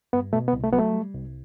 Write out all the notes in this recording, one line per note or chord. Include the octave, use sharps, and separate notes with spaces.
G2 B3
B2 A3
B3
C2
A3
F#3 B3
A3
G3
C2